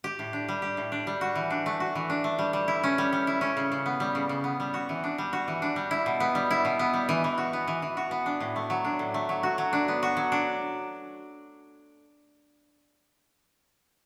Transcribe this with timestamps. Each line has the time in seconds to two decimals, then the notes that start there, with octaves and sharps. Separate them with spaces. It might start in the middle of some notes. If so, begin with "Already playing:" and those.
0.04 G4
0.19 A2
0.33 D4
0.49 G3
0.62 G4
0.77 A2
0.92 D4
1.07 G3
1.21 F#4
1.35 E3
1.50 D4
1.66 A3
1.80 F#4
1.95 E3
2.10 D4
2.24 A3
2.39 G3
2.53 G3
2.68 E4
2.84 C#4
2.98 G3
3.13 G3
3.27 E4
3.41 C#4
3.57 C#3
3.72 C#3
3.86 B3
4.00 G3
4.15 C#3
4.29 C#3
4.44 B3
4.60 G3
4.74 F#4
4.89 E3
5.04 D4
5.18 G3
5.33 F#4
5.48 E3
5.62 D4
5.76 G3
5.91 E4
6.06 B2
6.20 B3
6.35 G3
6.51 E4
6.65 B2
6.79 B3
6.94 G3
7.09 E3
7.24 E3
7.38 F#4
7.53 B3
7.67 E3
7.82 E3
7.97 F#4
8.11 B3
8.26 D4
8.40 A2
8.56 A3
8.70 F#3
8.84 D4
8.99 A2
9.14 A3
9.29 F#3
9.43 F#4
9.58 F#3
9.73 D4
9.88 B3
10.03 F#4
10.17 F#3
10.32 D4